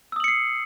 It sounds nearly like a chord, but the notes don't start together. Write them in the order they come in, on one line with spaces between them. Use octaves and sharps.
E6 D#6 F#7 C#7 C7